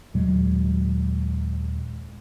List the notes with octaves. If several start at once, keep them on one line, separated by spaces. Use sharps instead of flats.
D#2 A#2 F#3 G#3